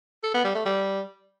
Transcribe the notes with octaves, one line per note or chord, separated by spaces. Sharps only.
A4
B3
G3
A3
G3